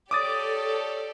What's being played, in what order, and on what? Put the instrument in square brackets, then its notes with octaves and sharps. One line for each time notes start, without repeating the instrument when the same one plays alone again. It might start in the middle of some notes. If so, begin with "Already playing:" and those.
[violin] G4 D5 [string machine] A4 [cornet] C#5 [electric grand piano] D6 D#6 A6